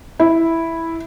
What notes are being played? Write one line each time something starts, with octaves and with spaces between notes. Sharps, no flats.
E4